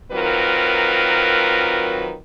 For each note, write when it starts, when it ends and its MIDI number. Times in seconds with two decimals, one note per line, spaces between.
0.12 2.15 51
0.12 2.15 54
0.12 2.15 60
0.12 2.15 65
0.12 2.15 70
0.12 2.15 71